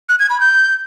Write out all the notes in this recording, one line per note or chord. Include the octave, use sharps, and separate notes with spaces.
F#6
G#6
B5
G6